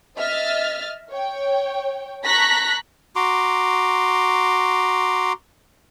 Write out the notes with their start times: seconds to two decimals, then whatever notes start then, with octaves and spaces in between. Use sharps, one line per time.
0.17 D#5 E5 F6 A6
1.11 C#5 G5
2.25 A5 A#5 C#6 F#6 A#6 B6
3.16 F#4 A#5 C6 D6